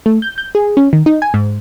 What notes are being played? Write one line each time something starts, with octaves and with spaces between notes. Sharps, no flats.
A3
G6
G6
G#4
C#4
D#3
D#4
G#5
G#2